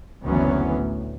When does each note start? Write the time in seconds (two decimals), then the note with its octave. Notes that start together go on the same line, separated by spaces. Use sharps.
0.25 F#1 D2 E3 F#3 B3 C#4
0.73 A1